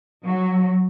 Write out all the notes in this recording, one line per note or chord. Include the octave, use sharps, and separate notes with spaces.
F#3